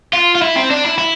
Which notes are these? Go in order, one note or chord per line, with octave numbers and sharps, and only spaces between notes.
F4
F4
E4
C4
D4
E4
E4